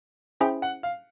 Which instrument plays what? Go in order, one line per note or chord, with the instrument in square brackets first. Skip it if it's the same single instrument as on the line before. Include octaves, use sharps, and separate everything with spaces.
[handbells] C#4 E4 G#4 C5 E5 [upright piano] G5
[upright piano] F#5
F5